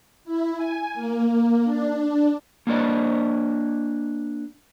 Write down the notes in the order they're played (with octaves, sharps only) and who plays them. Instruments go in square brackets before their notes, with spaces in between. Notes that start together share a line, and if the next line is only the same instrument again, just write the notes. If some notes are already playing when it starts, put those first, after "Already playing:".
[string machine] E4
G#5
A#3
D4
[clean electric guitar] A#3 D4 D5 D#5